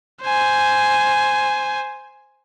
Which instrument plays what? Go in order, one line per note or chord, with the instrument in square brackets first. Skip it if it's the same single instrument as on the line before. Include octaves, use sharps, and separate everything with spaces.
[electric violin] C5 G#5